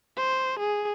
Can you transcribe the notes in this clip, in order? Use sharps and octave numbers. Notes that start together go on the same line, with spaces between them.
C5
G#4